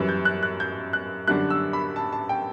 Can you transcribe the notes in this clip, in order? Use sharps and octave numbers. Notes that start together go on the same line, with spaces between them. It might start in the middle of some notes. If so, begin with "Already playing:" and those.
Already playing: F#2 E3 G3 F#6
G6
F#6
F#6
G6
F#6
F#2 D3 G3 D4 F#6
E6
B5
A5
A5
G5